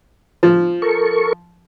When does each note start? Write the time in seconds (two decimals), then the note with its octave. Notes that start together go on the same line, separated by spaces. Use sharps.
0.43 F3
0.82 A4 A#4 C#6